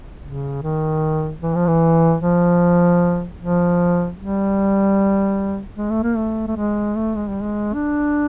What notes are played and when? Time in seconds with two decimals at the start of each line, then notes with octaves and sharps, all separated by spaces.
0.24 C#3
0.63 D#3
1.42 E3
1.55 F3
1.67 E3
2.21 F3
3.40 F3
4.19 G3
5.77 G#3
5.90 A3
6.03 A#3
6.16 A3
6.47 A3
6.56 G#3
6.95 A3
7.15 G#3
7.28 G3
7.42 G#3
7.74 D4